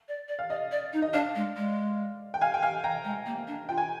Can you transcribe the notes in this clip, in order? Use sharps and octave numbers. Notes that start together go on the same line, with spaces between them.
D5
D5
F5
D5 D#5
D5
D#4
D#5
D4 D5 F5
G#3
G#3
G5
F5 G#5
G5
F5 G#5
G5 A#5
G#3
A#3
D4
F4 G5
G#5